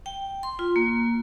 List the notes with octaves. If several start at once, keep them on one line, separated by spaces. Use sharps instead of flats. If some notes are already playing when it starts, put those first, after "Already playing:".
G5
C6
F4
A#3